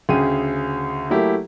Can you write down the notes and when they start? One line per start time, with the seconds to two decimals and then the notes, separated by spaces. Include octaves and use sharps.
0.09 D2 C#3 G#4 G5 D#7
1.10 F#3 A3 A#3 E4 G4